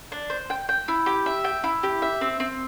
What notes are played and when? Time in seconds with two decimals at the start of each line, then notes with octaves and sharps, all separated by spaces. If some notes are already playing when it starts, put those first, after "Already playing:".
0.12 D4
0.30 C5
0.50 G5
0.69 G5
0.88 E4
1.06 G4
1.26 E5
1.44 G5
1.64 E4
1.83 G4
2.02 E5
2.21 C4
2.40 C4